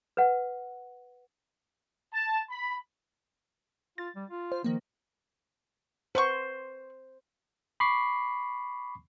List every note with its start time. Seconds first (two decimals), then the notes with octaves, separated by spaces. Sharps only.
0.17 B4 F#5
2.13 A5
2.50 B5
3.98 F4 A6
4.16 G3
4.30 F4
4.52 C5
4.64 D#3 F3 A#3
6.15 B4 C5 F#5 C#6
7.80 B5 C#6 D6 C7